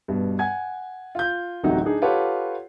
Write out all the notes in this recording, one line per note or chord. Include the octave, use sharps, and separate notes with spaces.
G2 B2
F#5 G#5 G#6
F4 G6
D1 A1 C3 F#3 D#4 F#5
D4 D#4 G#4
F4 G4 A4 B4 C#5 F#5